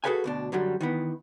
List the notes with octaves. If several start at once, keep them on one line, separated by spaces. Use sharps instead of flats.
F#4 G#4 A4 B4 F5 G#5
D2 B2 D4
F#2 D3 F#3 G3
D#3 E3 B3